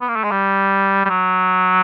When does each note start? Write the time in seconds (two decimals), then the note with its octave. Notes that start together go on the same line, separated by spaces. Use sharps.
0.01 B3
0.08 A#3
0.16 A3
0.24 G#3
0.32 G3
1.05 G3
1.10 F#3